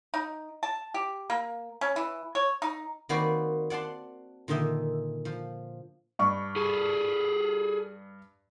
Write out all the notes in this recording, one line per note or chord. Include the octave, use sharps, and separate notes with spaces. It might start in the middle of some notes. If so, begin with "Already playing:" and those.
D#4
A5
G4
A#3
C#4
E3
C#5
D#4
D#3 A#3 C4 F#4 B4 D5
D5 F#5 A5 C6
A#2 D3 D#3 D#5 E5
F3
G2 C#6
G#4 A4